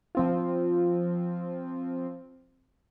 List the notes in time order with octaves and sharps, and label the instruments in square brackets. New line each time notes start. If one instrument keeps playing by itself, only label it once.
[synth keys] F3 C4 F4